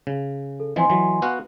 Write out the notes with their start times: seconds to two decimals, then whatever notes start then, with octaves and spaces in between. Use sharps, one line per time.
0.07 C#3
0.60 A4
0.76 E3 F3 C4 D#5 G#5 C6
0.90 E3 F#3
1.22 B3 F#4 F5